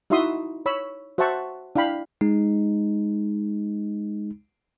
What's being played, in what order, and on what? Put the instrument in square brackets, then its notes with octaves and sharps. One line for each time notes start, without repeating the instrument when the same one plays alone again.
[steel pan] D#4 E4 F#4 E5 C6 D#6
C#5 B5 E6
F#4 C5 E5 F#5 A5 C#6
D4 E4 F5 G5 B5
[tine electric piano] G#3 D#4